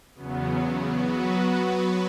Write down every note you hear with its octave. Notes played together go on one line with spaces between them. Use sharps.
E2 C#3 F#3 B3
F#3 B3 F#4 B4